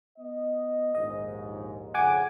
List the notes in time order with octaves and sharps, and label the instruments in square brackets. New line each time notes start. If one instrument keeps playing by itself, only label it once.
[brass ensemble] B3 D#5
[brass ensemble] A#1 D#2 G#2 [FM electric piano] D#5
[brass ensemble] F2 A#2 C#3 [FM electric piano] F#5 G#5 D6